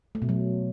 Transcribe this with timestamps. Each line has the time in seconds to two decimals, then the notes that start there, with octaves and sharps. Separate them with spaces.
0.15 A3
0.22 B2
0.29 F#3